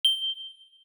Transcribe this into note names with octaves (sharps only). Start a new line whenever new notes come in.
G7